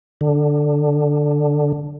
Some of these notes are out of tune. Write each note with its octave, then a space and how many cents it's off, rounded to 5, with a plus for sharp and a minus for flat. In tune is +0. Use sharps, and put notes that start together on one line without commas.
D3 +5